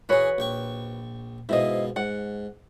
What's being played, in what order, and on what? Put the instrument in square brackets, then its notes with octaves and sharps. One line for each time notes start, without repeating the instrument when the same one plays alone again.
[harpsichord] E3 G#4 [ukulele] F#4 B4 C#5
[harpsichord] A#1 G5 C#6
[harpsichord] G#2 B2 F3 [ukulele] E4 D#5
[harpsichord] G#2 [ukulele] F#5